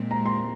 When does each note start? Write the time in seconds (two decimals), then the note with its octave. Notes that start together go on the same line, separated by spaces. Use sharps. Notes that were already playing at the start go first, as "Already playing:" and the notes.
Already playing: A#2 G#3 C4
0.11 A#5
0.26 C6